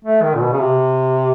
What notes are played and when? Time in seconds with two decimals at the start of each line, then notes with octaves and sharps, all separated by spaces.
0.05 A3
0.23 D#3
0.35 A#2
0.42 B2
0.53 C#3
0.59 C3